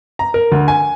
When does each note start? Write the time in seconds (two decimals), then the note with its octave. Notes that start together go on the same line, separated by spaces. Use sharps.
0.19 A#5
0.34 A#4
0.52 D2
0.68 G#5